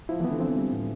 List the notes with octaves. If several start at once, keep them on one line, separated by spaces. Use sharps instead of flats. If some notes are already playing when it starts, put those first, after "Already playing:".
F3 E4
E3
B3
D3
E3 C4
G3
A2